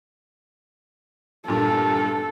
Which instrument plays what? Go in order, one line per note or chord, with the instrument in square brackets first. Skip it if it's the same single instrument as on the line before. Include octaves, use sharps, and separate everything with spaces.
[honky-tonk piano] G2 A#2 [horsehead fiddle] A4